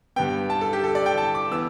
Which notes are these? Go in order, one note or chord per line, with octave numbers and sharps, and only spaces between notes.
G2 G3 B3 G5
A5
A4
G4
A4
D5
G5
A5
D6
E3 B3 E6